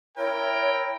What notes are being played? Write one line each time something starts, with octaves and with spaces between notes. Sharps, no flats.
E4 A#4 C#5 G5